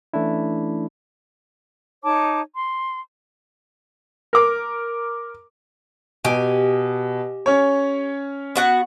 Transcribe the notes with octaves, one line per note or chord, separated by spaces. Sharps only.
E3 A3 C#4 D4 E4
D#4 C#5 A5 D6
C6
A#4 D6
B2 G4 G#5
C#4 C#5
B3 F#4 F#5